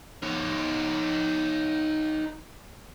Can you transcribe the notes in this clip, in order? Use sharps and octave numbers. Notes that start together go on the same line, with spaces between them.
D#4 C#5